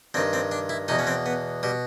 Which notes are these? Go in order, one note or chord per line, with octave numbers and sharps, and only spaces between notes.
G2 D#3 C4
C4
D4
E4
E2 B2 D#4
C#4
C4
B3
B2 G3